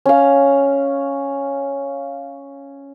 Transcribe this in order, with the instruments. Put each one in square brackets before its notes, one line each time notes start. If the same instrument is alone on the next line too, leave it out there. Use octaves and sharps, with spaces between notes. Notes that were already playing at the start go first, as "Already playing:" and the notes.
[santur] C#4 F5